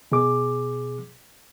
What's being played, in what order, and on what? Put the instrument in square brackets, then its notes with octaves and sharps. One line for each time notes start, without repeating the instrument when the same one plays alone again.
[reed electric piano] B2 G#4 D6